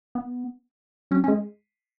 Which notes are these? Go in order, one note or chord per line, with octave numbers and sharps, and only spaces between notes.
B3
F#3 C#4
C#4
G#3